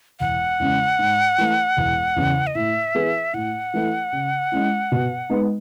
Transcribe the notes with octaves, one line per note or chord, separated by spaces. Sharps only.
E1 F#5
E2 C#3 G#3 C#4
G#2
E3 A3
E1
E2 C#3 E3
D#5
A2 E5
E3 B3 E4 G#4
A2 F#5
E3 A3 E4 A4
C#3
G#3 C#4 E4
B2
G#3 B3 D#4